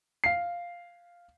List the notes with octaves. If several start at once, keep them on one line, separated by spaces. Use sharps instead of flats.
F5 C7